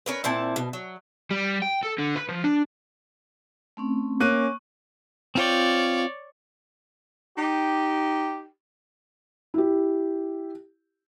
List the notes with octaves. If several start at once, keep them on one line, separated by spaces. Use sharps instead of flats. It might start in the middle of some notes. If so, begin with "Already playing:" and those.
C#4 A#4 B4
A#2 C4 E4 A5
B2
F#3
G3
G5
A4
D3
B4
F3
D4
A3 C4 C#4
A#3 C#4 C#6 F#6 D#7
C4 F4 C#5 D5 G5
D#4 G4
E4 G4